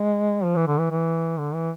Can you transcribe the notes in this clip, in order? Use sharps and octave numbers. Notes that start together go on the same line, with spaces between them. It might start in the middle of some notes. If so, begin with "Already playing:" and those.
Already playing: G#3
F3
E3
D3
E3
E3
D3
E3